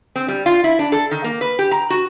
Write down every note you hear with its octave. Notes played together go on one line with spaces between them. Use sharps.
C4
G3
F4
E4
D4
A4
D#3
A#3
B4
G4
A#5
F#4